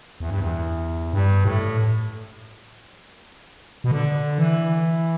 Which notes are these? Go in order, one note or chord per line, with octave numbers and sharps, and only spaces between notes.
E2
G2
E2
G2
A2
B2
D3
E3